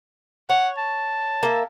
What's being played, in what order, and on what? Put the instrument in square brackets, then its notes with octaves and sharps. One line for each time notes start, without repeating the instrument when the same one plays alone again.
[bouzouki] C#5 [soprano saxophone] F#5
[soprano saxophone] A5
[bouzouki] A#3 E5